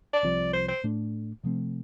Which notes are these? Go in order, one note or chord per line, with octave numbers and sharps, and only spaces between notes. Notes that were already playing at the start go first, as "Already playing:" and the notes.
D5
C2 C3 F3
C5
C5
A2 A3 D4
C3 F3 A3 C4